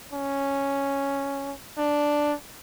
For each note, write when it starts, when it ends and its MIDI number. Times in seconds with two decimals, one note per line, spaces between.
0.13 1.53 61
1.78 2.34 62